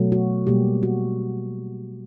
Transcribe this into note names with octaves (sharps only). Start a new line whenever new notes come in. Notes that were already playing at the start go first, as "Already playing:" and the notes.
Already playing: B2 F#3 A3
F#4
B2 G3 A#3 G4
F#4